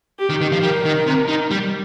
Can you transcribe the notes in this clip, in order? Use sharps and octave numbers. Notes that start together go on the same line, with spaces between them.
G4
D#3
D#3
F3
G3 A#4
D#3
C3
D#3
G3